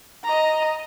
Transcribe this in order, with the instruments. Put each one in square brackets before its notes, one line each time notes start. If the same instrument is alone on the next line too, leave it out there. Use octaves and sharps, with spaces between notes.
[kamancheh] D#5 A#5